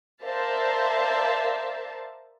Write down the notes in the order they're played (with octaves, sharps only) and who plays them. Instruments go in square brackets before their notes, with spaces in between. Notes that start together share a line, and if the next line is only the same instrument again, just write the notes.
[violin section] A#4 C5 D5 E5 F5 A5